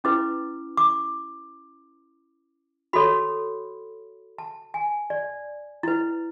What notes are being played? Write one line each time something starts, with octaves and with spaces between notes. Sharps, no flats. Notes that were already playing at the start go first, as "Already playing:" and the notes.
C#4 E4 B4 D6
D6
F#4 A4 C#5 B5
A5
G#5
D5
E4 B4